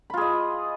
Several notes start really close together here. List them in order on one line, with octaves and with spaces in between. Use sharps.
B5 F4 G#4 D#5